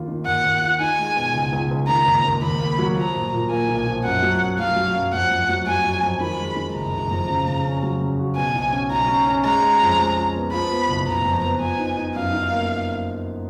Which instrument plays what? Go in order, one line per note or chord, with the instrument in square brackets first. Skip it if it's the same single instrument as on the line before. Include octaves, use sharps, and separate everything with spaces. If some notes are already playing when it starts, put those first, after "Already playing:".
Already playing: [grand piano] D#2 F4
D#3
[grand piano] D#2 [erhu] F#5
[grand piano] D#2
F4
[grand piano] D#4 [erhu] G#5
[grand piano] G#3
B2
C#2
C#2
C#2
[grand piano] D#3 [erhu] A#5
[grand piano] D#2
D#2
[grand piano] D#2 [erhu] B5
[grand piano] A#3
F#3
[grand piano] F3 [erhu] A#5
[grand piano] A#2
A#2
[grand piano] A#3 [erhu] G#5
[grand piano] B1
F3
[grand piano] F#2 [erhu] F#5
[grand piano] F#3
F#2
[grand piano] F#3 [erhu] F5
[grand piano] F#3
F#2
[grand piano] F2 [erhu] F#5
[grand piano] F2
F#3
[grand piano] F#3 [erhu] G#5
[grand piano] F#3
F2
[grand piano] D#3 [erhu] B5
[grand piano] G#3
D#3
[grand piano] F#1 [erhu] A#5
[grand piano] F#1
F2
C#3
C#3
C#4
F#3
C#3
F#4
[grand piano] B2 [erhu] G#5
[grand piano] B1
C#4
[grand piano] B1 [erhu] A#5
[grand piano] C#4
C#4
[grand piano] G#3 [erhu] A#5
[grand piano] G#3
F2
G#3
F3
B3
[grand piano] F3 [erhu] B5
[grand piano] B3
F#1
[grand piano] F#1 [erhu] A#5
[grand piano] F2
B3
[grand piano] F3 [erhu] G#5
[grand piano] D#4
D#4
[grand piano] F#2 [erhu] F5
[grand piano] D#4
A#3